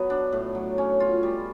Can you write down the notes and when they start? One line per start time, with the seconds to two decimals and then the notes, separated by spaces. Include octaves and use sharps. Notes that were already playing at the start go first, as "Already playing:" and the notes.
Already playing: F#3 B3
0.10 D4
0.32 A2
0.55 F#3
0.78 C#4
1.00 F4
1.23 G3